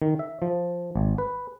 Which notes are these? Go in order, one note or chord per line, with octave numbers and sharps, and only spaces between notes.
D#3
E5
F3
G#1
B4